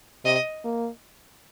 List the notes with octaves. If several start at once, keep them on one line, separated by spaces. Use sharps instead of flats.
C3 D#5
A#3